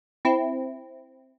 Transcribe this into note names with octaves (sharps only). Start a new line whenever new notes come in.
C4 E4